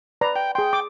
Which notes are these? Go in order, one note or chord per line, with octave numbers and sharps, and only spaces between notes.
B4 D5 A#5
G5
G#4 G5 C6
D6